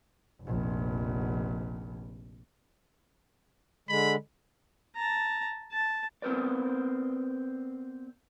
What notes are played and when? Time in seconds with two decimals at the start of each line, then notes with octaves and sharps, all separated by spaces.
0.43 F1 A#1
3.89 D3 G#3 B5
4.95 A5 A#5
5.73 A5
6.22 B3 C4 A#4 B4 D5